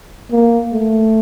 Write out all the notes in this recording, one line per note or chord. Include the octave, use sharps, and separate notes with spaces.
A#3
A3